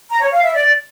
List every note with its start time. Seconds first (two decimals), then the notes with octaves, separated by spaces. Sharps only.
0.09 A#5
0.20 C#5
0.32 F5
0.43 E5
0.54 D5